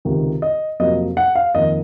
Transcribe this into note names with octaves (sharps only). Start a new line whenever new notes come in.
C#2 C3 D#3
D#5
F2 C3 F#3 A#3 D#5
F#5
F5
F2 D#3 A#3 D#5